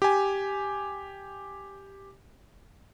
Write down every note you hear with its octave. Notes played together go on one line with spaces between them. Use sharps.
G4 G#5